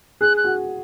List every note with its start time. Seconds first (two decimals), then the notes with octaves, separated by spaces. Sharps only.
0.21 G#4 F#6
0.37 F#6
0.44 F#4